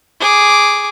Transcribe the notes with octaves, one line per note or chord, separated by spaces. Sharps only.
G#4 D6